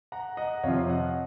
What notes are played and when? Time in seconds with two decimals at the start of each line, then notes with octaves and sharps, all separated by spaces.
0.12 F#5 A#5
0.37 D#5 F#5
0.63 F2 C3 F3 C#5 F5
0.90 D#5 F#5